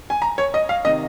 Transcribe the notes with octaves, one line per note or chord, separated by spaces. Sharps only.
G#5
A#5
C#5
D#5
F5
C3 D#3 D#5